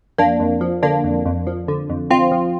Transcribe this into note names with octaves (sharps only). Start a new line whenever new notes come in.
F2 A#3 D4
F2
F3
D3 A#3 D4
F2
F2
F3
D3
F2
F2 C4 F4
F3